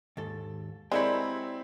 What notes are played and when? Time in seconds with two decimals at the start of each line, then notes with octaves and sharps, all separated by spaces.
0.17 D#2 G#2 A4
0.92 G#3 C4 E4 G4 A#4 C#5 D5 B5